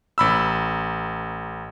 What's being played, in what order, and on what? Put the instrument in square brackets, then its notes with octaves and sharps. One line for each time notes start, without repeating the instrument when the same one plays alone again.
[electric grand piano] A1 B5 E6